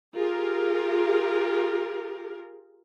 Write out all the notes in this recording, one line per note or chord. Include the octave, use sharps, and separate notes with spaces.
F4 G4 G#4 A#4